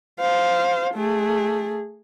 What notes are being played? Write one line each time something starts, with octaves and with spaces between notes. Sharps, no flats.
C5 F5
A3 G#4